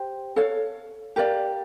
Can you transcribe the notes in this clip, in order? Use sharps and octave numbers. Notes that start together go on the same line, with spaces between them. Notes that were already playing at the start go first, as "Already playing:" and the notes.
Already playing: G4 C5
A4 C#5 F5
G4 A#4 D5 F5